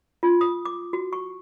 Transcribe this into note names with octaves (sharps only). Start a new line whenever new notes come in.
F4
D#6
D6
F#4
C#6